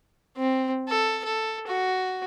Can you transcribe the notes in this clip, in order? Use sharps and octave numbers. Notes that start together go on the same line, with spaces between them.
C4
A4
A4
F#4